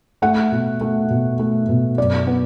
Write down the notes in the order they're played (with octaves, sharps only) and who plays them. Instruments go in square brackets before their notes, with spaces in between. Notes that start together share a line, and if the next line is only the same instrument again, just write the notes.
[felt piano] A3 F#5
B2
A3
B2
A3
B2
F#2 D5
B3